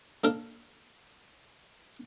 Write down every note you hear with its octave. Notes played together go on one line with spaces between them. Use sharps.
A#3 D4 A4 A#4